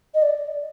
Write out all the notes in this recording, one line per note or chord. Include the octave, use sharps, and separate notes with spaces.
D#5
D5